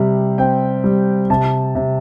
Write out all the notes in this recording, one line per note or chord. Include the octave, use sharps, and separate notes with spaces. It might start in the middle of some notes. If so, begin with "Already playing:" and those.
Already playing: C3 G3
C4 G5
G3
C3 A5
C3